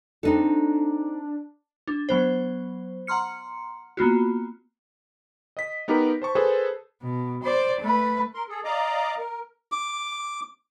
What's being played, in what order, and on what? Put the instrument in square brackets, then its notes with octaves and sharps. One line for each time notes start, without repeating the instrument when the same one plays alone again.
[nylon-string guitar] C4 D#4 A4 [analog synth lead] D4
[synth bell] D4
F#3 B3 C5
F#5 A#5 C6 F6 C#7
A#3 B3 F4 F#4
[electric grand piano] D#5 B6
B3 D#4 G4 A#4 B4
C5 A5 C#6
G#4 A4 B4 C5
[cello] B2
C5 D5
A3 B4
[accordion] A#4 C6
G#4 A4
D5 D#5 F5 A#5 D6
A#4
[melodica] D6